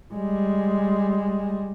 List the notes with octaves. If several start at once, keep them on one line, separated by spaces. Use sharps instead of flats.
G3 G#3